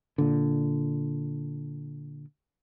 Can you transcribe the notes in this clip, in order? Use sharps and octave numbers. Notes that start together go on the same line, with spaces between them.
A#2 D3